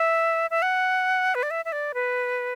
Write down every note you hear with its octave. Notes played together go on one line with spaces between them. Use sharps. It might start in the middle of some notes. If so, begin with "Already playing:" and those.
Already playing: E5
E5
F#5
B4
D5
E5
E5
D5
B4